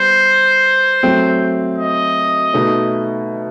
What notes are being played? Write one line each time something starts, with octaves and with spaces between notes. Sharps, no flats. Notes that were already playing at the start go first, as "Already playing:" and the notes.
Already playing: G3 B3 C5
F#3 A3 C4
D#5
B2 A3 D#4